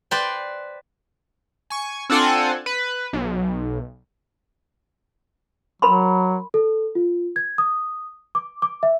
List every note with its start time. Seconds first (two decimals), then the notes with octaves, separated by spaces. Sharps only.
0.11 B4 C5 D5 G5 C6
1.70 G#5 C#6
2.10 C4 D4 F4 A4 F#5 G#5
2.66 B4
3.13 B1
5.82 F#3 A#4 B5 C6
6.54 A4
6.95 F4
7.36 G#6
7.58 D#6
8.35 D6
8.62 D6
8.83 E5